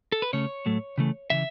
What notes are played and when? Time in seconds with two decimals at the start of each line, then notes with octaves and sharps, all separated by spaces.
0.12 A4
0.22 B4
0.33 C#3 A3 C#4 C#5
0.66 A2 F#3 A3
0.98 C#3 E3 A3
1.30 C#3 E3 E5